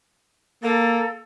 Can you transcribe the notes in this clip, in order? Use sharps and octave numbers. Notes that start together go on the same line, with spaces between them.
A#3 A4